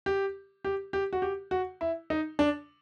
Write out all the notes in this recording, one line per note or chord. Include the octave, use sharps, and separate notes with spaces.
G4
G4
G4
F#4
G4
F#4
E4
D#4
D4